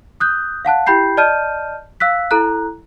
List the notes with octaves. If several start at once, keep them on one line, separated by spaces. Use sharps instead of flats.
D#6 F#6 G6
F5 F#5 A5 F#6
E4 G4 G5 B5 G6 C7
D5 D#5 A5 F6 G6 D#7
F5 E6 F#6 B6
E4 A4 A#5 F#6